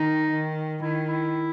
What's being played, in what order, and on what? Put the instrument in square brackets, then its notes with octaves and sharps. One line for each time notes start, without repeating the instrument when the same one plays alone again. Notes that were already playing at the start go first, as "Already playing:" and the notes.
Already playing: [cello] D#3 [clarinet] D#4
[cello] D#3
[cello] D#3 [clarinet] E4
[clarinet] E4